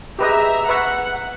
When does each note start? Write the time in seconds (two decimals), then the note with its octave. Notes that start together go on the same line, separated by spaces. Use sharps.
0.19 G4 G#4 B4 D#5 E5 A#5
0.69 B4 E5 F#5 C#6